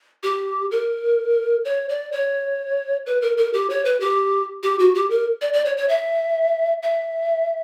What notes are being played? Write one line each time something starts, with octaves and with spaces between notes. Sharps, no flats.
G4
A#4
C#5
D5
C#5
B4
A#4
A#4
G4
C#5
B4
G4
G4
F#4
G4
A#4
D5
D5
C#5
C#5
E5
E5